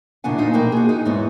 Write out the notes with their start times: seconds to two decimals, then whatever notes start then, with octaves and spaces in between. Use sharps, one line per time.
0.24 E2 A#2 C#3 D4 F#5 G#5
0.38 D#4 F4 C5
0.54 B2 F3 A#3 G5
0.72 F#4 G#4
0.89 D#4
1.05 E2 G#2 G#3 B3 C#5